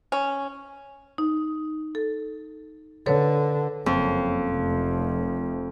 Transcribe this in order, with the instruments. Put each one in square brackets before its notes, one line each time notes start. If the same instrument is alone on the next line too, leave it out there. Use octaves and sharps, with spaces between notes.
[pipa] C#4
[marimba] D#4
A4
[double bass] D3 [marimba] A4 B4 C#5
[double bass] F#1 [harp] F2
[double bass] F1 F3